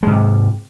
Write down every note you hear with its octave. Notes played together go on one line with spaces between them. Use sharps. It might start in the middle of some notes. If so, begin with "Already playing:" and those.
G#2 C3 G#3